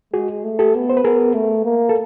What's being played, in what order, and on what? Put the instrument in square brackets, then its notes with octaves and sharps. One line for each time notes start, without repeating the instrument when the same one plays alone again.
[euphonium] G#3 [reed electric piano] F#4 G#4
[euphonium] A3
[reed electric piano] G4 A4
[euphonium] B3
[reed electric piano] C5
B4
[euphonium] B3 [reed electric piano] G#4 A#4
[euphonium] A3
A#3
[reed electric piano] A4